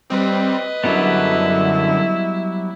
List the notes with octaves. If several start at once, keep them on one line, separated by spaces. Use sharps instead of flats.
G3 C4 B4 D#5
F#2 D3 F#3 G3 B3 E4